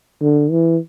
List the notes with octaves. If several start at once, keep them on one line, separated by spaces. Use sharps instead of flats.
D3
E3